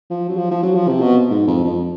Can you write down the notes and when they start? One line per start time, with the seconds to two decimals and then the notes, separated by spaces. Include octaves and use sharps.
0.10 F3
0.29 F#3
0.37 F3
0.51 F3
0.63 F#3
0.75 F3
0.88 C3
1.01 B2
1.30 G#2
1.47 F2
1.65 F2